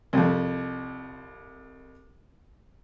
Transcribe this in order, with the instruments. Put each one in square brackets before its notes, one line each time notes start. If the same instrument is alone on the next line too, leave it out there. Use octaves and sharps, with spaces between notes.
[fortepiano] C2 F2